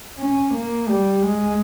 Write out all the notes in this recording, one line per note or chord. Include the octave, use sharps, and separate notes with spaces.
C#4
A#3
G3
G#3